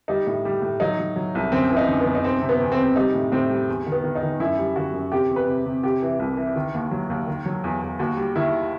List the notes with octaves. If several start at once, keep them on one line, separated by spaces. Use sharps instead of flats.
G3 D#4
A2
G3
A2
F#3 D#4
F#3
F#3
C2
F#2 C4
E3
D#4
F#2
B3
F#2
D#4
C3 C4
C3
B3
E2
C4
C3
G3 D#4
A2
A2 C4
G3
E2
D#3
B3
D#3
D#4
D#3
F#2 E4
G3
D#3 F#4
F#2
C3 G4
E2
B4
C3
C3
C3 G4
E3
C2
E3
D#3
D#2
F#3
D#2
D#3
F#3
E2
E2
D#2 F#4
G3
D#3 E4